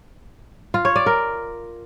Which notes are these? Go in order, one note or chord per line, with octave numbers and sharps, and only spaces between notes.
F4
C#5
D5
A#4